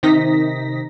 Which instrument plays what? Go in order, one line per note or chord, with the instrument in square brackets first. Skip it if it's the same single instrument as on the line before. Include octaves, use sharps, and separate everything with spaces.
[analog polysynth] C3 D#3 D#4 A#6 B6